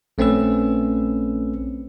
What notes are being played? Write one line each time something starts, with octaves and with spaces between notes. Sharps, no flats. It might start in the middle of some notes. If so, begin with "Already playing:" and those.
A#1 A3 C4 C#4 B4 E6